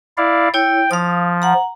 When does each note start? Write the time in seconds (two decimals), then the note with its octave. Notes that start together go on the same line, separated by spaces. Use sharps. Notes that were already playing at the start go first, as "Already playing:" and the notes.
0.18 E4 D5 F5
0.54 E4 C#5 G5
0.91 F3 F5 D#6
1.42 F#5 A#5